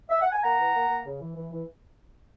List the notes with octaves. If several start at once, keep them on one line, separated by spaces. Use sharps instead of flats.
E5
F#5
G#5
A#3 F#5 A#5
E3
A#3
A#3
C#3
E3
E3
E3